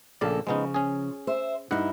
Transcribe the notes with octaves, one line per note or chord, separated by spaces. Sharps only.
A#1 C#3 A#3 A4 D5
C#3 F3 G#3 B3 D#4
C#4 G#4
C5 E5
G2 D#4 E4 F#5